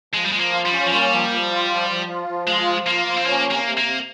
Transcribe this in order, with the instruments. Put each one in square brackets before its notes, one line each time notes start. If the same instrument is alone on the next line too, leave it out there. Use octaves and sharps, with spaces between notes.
[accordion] F3 [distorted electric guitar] G#3
[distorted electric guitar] G3
[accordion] F3 [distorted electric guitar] G#3
[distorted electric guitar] A#3
[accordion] F4
[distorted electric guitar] G3
[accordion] C#4
[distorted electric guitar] F3
[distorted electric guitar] G3 [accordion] A#3
[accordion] F3
F3
F4
F3
F3
F4
F3
[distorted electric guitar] G#3 [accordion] F4
[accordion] F3
[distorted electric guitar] A#3 [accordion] F4
[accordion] F3
[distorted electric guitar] C4
[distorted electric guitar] A#3 [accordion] C#4
[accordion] C3
[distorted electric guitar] A#3
[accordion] C3
[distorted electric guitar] A#3
[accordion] C3